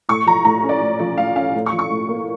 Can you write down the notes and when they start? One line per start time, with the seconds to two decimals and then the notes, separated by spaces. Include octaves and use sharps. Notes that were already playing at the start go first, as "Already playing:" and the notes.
0.09 A2 C#6
0.26 F3 A#5
0.44 A2 A#5
0.64 C#4
0.69 D5
0.82 A2
0.99 F3 D5
1.17 A2 F5
1.36 C#4 F5
1.54 A2
1.66 C#6
1.72 F3
1.79 C#6
1.90 A2
2.09 A#3